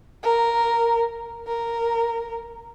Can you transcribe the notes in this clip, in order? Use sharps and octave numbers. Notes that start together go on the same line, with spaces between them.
A#4
A#4